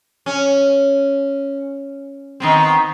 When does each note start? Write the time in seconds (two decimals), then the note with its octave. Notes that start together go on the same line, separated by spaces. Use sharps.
0.26 C#4
2.40 D#3 B3 C4